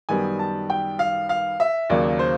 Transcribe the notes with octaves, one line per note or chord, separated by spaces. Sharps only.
F#2 D#3 G3 B3 G#5
A5
G5
F5
F5
E5
D#2 C#3 F#3 A#3 D5
C5